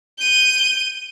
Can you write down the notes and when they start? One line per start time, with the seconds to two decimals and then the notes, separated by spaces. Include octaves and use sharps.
0.18 G6 D#7